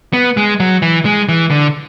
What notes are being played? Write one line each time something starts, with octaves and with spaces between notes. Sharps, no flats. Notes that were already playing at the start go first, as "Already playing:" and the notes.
B3
G#3
F#3
E3
G#3
E3
D3